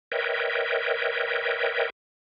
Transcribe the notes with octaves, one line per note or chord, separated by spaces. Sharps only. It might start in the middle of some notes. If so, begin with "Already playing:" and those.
A#4 B4 C#5 D#5 E5 G5